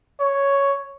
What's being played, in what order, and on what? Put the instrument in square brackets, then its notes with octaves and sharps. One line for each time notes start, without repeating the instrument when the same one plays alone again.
[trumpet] C#5